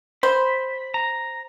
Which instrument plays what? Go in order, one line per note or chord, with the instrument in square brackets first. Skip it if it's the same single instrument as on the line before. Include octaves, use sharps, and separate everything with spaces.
[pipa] C5 [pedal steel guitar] B5
[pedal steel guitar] A#5